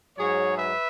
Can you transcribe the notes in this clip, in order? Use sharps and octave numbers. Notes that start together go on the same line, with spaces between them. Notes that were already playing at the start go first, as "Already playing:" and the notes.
G#2 F#3 G#4 C#5
B4 E5